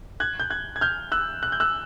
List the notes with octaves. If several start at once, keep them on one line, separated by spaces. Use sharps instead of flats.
F#6 G#6
G6
F#6 G#6
G#6
F6 G6
E6 F#6
F#6
G6
E6 F#6